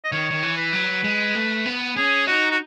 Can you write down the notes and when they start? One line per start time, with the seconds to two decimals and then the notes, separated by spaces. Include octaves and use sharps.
0.04 D#5
0.12 D#3 C#5
0.31 D#3
0.43 E3
0.57 B4
0.73 F#3
1.04 G#3
1.35 A3
1.66 B3
1.97 C#4 G#4
2.27 D#4 F#4
2.51 F#4